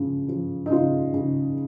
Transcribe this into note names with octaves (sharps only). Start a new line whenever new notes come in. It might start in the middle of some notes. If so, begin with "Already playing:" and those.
Already playing: C#3 F3
F3
D#4
C#3 F4
C#3